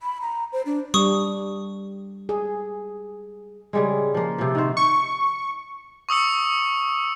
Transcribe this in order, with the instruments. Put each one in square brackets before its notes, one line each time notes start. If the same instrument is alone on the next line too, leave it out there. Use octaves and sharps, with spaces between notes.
[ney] B5
A#5
C5
D4
[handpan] G3 D4 [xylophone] C#6 D#6
[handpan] G#4
[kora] C#3 G3 G#3
F3 A#3
C3 F3
D#3 F#4 C5
[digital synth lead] C#6
[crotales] C#6 D#6 E6 C#7